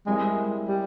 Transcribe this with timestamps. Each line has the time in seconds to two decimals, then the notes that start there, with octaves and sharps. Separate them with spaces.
0.07 G3 G#3 C4 E4 A#4
0.68 G3